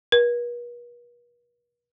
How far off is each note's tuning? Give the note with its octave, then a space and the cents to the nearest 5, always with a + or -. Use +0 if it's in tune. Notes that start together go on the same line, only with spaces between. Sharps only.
B4 -45